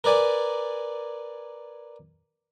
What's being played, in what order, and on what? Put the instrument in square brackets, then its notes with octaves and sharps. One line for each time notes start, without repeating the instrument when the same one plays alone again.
[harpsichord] A#4 B4 D5 G#5